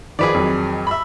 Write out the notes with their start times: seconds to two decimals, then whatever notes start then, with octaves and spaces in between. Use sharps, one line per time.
0.19 D#3 F3 G#4 B4 D5
0.34 F2 D#3 F#3
0.87 E5 B5